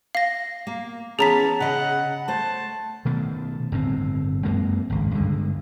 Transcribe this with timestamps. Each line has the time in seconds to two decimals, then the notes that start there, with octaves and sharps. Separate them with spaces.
0.15 F5 A#6
0.67 A#3
1.19 E3 B3 C#4 G#4 A5 A#5 B6
1.60 C#3 D#5 F#5
2.28 A3 C5 A5
3.05 B2 D#3 A3
3.72 G1 A2 C4
4.45 F#2 G#3 A#3 C4
4.90 G#1 C#2
5.14 G2 D3 G#3